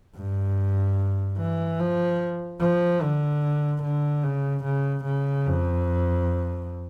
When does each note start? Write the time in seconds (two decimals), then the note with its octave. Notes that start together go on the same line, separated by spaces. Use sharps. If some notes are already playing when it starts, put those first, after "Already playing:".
0.16 G2
1.38 E3
1.80 F3
2.60 F3
3.02 D3
3.83 D3
4.23 C#3
4.65 C#3
5.04 C#3
5.46 F2